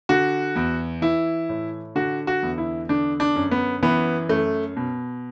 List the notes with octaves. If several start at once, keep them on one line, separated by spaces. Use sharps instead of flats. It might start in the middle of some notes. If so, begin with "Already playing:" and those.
D3 F#4
E2
E3 E4
A2
D3 F#4
F#4
E2
E4
D3 D4
D4
F#2
B3
E3 B3
F#2 A3
B2